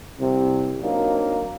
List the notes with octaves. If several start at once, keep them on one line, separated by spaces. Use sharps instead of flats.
C2 C3
F#3 A#3 C4 D4 D#4